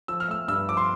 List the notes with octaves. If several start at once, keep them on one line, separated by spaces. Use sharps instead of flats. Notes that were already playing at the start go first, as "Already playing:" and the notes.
F3 E6
F6
A3 E6
G2 E6
F3 D6
C6